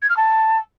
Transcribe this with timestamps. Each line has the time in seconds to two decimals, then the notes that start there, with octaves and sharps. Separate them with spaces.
0.02 G#6
0.09 F6
0.17 A5